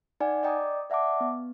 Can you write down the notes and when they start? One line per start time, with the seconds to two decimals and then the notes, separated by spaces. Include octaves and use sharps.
0.20 D#4 D5 F#5 G#5
0.43 D5 D#5 G5 A#5 D6 D#6
0.90 D5 E5 F#5 A5 D6
1.21 B3